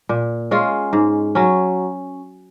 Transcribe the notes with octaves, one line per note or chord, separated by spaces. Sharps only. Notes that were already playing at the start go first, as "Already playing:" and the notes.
A#2
G#3 C#4 F4
G#2
F#3 C#4